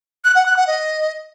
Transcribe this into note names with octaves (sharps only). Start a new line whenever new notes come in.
F#6
F#5
F#6
F#5
D#5